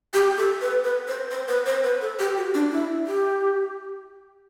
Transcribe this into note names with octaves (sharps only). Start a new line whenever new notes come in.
G4
A4
B4
B4
C5
C5
B4
C5
B4
A4
G4
F#4
D4
E4
G4